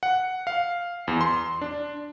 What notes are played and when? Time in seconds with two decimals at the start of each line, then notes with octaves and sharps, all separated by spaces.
0.03 F#5
0.47 F5
1.08 E2
1.21 C6
1.61 D4